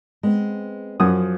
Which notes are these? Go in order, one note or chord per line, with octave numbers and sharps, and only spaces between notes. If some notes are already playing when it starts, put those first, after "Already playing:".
G#3 B3 C4
F#2 F3 F#4 D#6